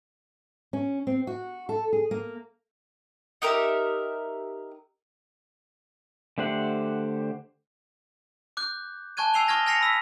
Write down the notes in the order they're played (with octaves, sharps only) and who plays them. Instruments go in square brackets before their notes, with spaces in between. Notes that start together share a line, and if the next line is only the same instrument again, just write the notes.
[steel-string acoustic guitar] C#4
C4
F#4
A4
G#4
A#3
[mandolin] D#4 G4 A#4 E5
[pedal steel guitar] D3 A3 G4 C5 F#5
[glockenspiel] D6 F#6 G6
G#5 A5 C#6 F#6 G#6 D#7
G#5 E6 C7 D#7 F7 G7
C#6 D#6 F6 G#6 A#6
G#5 F6 A#6 C7 C#7 F7
B5 E6 B6